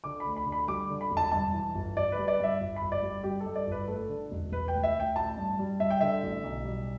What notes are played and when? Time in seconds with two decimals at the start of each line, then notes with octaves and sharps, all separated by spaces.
0.04 D3 D6
0.20 B5
0.26 D2
0.36 B5
0.46 D3
0.52 B5
0.68 G3 D6
0.90 D3
1.01 B5
1.11 E1
1.17 A5
1.32 G2 A5
1.53 E3
1.74 G1
1.96 G1 D5
2.12 B4
2.18 G3
2.28 D5
2.39 G2 E5
2.60 G1
2.76 G1 B5
2.92 D5
3.02 G3
3.24 G2 G4
3.40 A4
3.46 G2
3.56 D5
3.67 G1 B4
3.87 A3 A4
4.09 D3
4.31 E1
4.52 E1 B4
4.68 D2 G5
4.83 E5
4.95 D2
5.00 G5
5.16 A1 A5
5.37 G2
5.59 G3
5.80 G2 E5
5.90 G5
6.01 D3 E5
6.23 A1
6.44 B1
6.65 G3